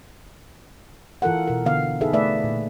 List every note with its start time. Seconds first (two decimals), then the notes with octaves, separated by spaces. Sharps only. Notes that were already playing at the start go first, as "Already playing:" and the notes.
1.22 E3 F4 A4 A#4 F#5
1.48 B2 A#4
1.65 D3 B3 F5
2.01 D#4 G#4 A4 B4 E5
2.13 A3 B4 D5 E5
2.44 A#2